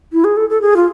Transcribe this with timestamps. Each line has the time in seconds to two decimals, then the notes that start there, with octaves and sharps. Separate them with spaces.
0.13 E4
0.24 G#4
0.37 A4
0.50 A4
0.61 G#4
0.76 F4